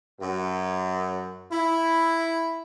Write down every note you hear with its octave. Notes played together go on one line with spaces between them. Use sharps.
F#2
E4